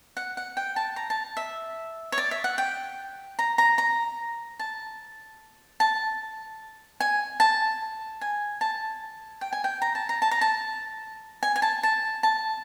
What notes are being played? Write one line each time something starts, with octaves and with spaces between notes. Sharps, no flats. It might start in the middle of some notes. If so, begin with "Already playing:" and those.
F#5
F#5
G5
A5
A#5
A5
E5
C#5
D5
E5
F#5
G5
A#5
A#5
A#5
A5
A5
G#5
A5
G#5
A5
G5
G#5
G5
A#5
A5
A#5
A5
A#5
A5
G#5
G#5
A5
A5
A5